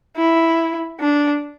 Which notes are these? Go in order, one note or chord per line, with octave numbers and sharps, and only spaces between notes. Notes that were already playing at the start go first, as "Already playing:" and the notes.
E4
D4